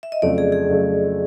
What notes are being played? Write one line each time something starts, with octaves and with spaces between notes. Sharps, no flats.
E5
D#5
F2 C#3 F#3 A3 D5
G#4
G#4
F2 C#3 F#3 A3